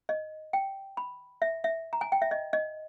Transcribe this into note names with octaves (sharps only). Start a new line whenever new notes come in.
D#5
G5
B5
E5
E5
A#5
G#5
G5
E5
D#5
D#5